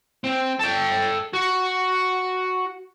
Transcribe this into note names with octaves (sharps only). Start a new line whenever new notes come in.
C4
A4 G5
F#4